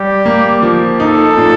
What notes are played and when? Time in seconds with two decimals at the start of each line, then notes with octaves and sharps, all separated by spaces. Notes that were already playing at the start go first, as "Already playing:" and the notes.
Already playing: G3 G4
0.25 A#3
0.62 F3
1.00 D#4 A4
1.37 A#2